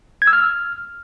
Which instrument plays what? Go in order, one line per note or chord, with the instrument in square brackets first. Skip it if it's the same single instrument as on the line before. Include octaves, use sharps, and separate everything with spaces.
[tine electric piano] G#6
E6
F6